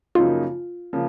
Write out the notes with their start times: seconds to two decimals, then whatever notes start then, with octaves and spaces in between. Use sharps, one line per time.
0.15 F#2 C#3 F3 A#3 D#4 F4
0.93 C#3 F3 A#3